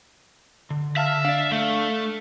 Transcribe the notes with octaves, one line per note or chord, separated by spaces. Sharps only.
D3
E5 F5 A5 F6
D4 D5 F5
A3